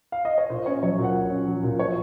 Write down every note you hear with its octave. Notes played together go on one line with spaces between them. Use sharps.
F5
D#5
C#5
A#2 C5
C#4 C#5
F#3 C#5
A#2
F#5
A#2
C#4
F#3
A#2
F3 C#5